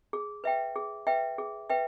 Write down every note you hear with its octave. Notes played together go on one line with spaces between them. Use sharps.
G#4
B4 E5 G5
G#4
B4 E5 G5
G#4
B4 E5 G5